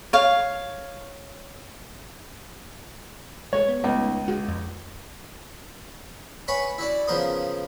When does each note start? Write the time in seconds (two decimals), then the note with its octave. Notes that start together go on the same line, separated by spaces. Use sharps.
0.13 C#5 F5
3.53 G#3 A3 C#5
3.68 B3
3.84 C#2 A3 B3 D#4
4.28 D3 G#3 F#4
4.48 F2
6.48 B4 C#5 F#5 G#5 B5 C#6
6.78 E4 F#4 D5
7.07 C#3 F3 B3 A#4 C5 D#6